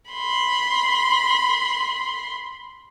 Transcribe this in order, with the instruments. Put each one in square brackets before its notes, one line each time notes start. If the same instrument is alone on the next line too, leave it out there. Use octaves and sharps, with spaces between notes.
[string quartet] B5 C6